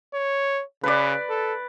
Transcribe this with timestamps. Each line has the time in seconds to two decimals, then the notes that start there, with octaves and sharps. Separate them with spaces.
0.14 C#5
0.83 C#3 B4 D5
1.30 A4